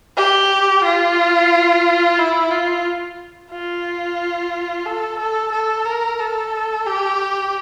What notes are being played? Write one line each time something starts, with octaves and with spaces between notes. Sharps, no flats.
G4
F4
E4
F4
F4
A4
A4
A4
A#4
A4
G4